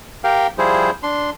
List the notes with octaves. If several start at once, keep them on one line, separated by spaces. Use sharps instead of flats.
G4 A#4 F5 G5
F3 G3 E4 G#4 C5
D4 C6